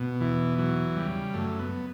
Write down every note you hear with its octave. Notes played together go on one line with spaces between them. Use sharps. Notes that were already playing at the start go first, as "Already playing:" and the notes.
Already playing: B2
E2 E3
E3 F#3
C#3 G3
F#2 A3
B3